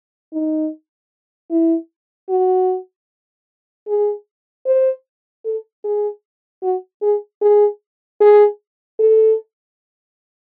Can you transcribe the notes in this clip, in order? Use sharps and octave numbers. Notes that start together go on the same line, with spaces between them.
D#4
E4
F#4
G#4
C5
A4
G#4
F#4
G#4
G#4
G#4
A4